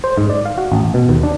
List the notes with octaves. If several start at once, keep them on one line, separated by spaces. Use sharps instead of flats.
C5
G#2
D5
F5
F#4
A1
B2
D#2
D4